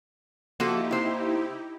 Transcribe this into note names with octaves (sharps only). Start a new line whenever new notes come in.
F3 A#3 D#4 E4 F#4 G4 A4
C3 C5